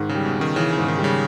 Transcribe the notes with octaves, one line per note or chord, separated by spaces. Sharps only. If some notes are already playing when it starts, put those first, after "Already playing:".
Already playing: G#2 D#3
C#3
G3
B2
C#4
D#3
C#3 E3
C#3
G#2
D#3
G3
C#3